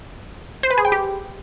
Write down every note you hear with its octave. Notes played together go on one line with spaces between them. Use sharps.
C5
B4
G#4
G5
G4